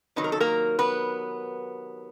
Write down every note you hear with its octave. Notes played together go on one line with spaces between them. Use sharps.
C3 D#3 F#3 B4
A#4
A4
A#3 A#4
B3 B4